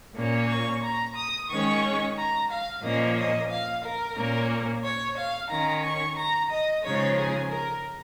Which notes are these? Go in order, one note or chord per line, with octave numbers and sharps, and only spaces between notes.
A#2 A#3 C#4
C#6
A#5
D#6
D#3 G#3 C#4 C#6
A#5
F5
A#2 F3 A#3 C#4 D#5
D#5
F5
A#4
A#2 A#3 C#4
C#5
F5
D#3 C#4 A#5
C#6
A#5
D#5
C#3 F3 G#3 D#4 C#5
G#4
A#4